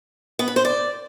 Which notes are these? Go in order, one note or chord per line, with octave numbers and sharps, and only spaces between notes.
B3
B4
C5
D5